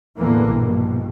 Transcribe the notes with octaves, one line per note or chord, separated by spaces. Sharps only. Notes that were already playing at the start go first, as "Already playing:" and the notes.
E2 A2 D3 E3 A#3
A#1 G2 B2